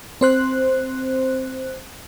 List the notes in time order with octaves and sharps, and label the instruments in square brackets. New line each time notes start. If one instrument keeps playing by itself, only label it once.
[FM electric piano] C4 C5 F#6